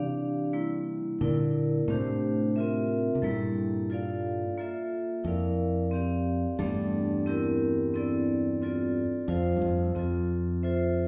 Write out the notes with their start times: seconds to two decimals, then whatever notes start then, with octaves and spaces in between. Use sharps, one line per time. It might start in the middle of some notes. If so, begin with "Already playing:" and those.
Already playing: C3 E3 D4 G4 D5 F5
0.53 G3 A#3 E4
1.21 A#2 D3 E4 A#4 D5
1.88 A2 C3 A3 D4 G4 C5
2.56 C4 F4 A#4 E5
3.15 C3
3.22 G2 A#2 G3 A#3 E4 A4
3.90 F4 A4 D5 F5
4.58 A#3 F4 A4 E5
5.24 F2 E4 A#4 D5 F5
5.91 C4 G4 D5 F5
6.59 E2 G2 A3 D4 A4 D5
7.26 C4 E4 G4 A#4
7.94 C4 E4 A4 D5
8.62 C4 F4 A4 D5
9.28 F2 F4 C5 F5
9.56 G2
9.62 F2
9.95 F2 C4 F4 A4
10.63 F4 A4 C5 E5